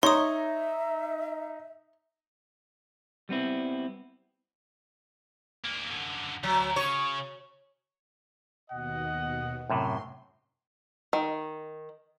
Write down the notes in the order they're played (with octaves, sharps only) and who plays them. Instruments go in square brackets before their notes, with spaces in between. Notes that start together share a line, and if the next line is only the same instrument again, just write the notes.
[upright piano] D#4 [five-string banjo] C#5 [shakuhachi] E5 [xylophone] C6 D#6
[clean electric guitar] G3 B3 C4 E4
[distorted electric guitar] D2 A#3
F#2 D3
[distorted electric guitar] D2 [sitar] F#3
[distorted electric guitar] C#3 [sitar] C#5
[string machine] D#2 B2 [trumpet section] D#5 F#5
[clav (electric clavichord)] F#2 A2 C3 [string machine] C6
[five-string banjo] D#3